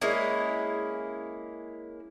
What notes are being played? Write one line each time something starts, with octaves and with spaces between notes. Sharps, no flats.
G#3 A#3 C#4 E4